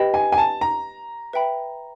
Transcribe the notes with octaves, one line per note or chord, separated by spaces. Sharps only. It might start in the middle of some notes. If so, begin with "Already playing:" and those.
Already playing: G4 B4 D#5 G5 B5
G#5
G#5
A5
A#5
B4 E5 G5 B5